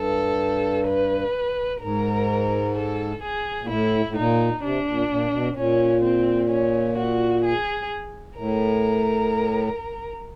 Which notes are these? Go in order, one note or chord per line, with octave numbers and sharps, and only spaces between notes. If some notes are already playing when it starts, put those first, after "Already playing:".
Already playing: G2 A4
B4
G#2 A#4
A4
G#4
A#2
A2 E4
A2
A#2 D#4
C3 D4
A#2
A#2
B2
A#2 C#4
C4
C#4
F#4
G#4
A2 A#4